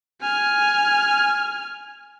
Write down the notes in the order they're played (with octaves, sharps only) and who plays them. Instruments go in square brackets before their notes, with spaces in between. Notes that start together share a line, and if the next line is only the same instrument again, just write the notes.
[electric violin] G#5 F6